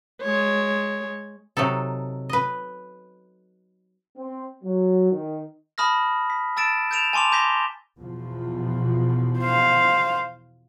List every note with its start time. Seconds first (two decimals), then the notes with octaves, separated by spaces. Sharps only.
0.22 G#3 C#5
1.57 C3 F#3 D#4 A4
2.29 B4 D#5
4.17 C4
4.64 F#3
5.12 D#3
5.78 A5 B5 D#6 F6 A#6
6.30 B6
6.57 A5 E6 A6 D7 E7
6.91 G6 A6 D7 E7 F7
7.13 G#5 A5 C6 D6 F7
7.32 A#5 D6 G6 A#6 B6 G7
7.98 E2 B2 F3
9.39 C5 F5